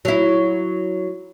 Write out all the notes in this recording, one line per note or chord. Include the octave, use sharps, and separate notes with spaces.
F#3 E4